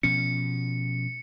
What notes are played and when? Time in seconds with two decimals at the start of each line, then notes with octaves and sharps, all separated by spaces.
0.03 B2 F3 C#4 C#7